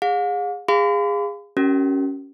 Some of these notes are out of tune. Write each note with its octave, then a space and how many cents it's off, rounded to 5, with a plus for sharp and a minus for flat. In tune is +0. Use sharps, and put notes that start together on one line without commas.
G#4 -20 F5 +45
G#4 -25 F5 +0 B5 +45
C#4 +0 F#4 +45 A#4 -15